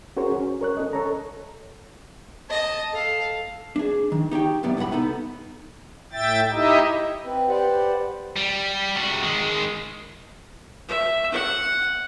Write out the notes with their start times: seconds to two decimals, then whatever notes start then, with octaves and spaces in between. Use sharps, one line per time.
0.17 C#4 F#4 G#4 A#4 C5 C#5
0.36 C#4
0.61 A#4 C#5 F#6
0.77 C#4 A4 D#5
0.93 A4 C#5 A#5
2.50 D#5 A5
2.93 A4 F5
3.76 D4 G#4
4.12 D#3
4.31 D#4 G4 C#5 G5
4.63 F#2 A2 C3 B3 D5
4.77 C2 A2 C#5 F#5 B5
4.92 B3 D#4 A4
6.13 A2 E5 G5 A6
6.52 D#4 E4 G4 D#5 E5
7.25 C4 B4
7.48 G4 B4 C5 D5 F#5
8.36 G3
8.96 C3 F#4
9.23 D#3 G#3
10.88 E5
11.32 F#5